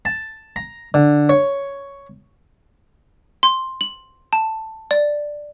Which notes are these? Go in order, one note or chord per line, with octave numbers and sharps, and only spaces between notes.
A5
A#5
D3
C#5
C6
F#7
A5
D5